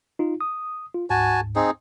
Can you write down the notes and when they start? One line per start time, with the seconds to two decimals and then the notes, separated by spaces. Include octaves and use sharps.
0.19 D#4 F4
0.41 D#6
0.94 F4
1.10 D2 G#2 F#4 G#5 A5
1.56 C4 D#4 G#4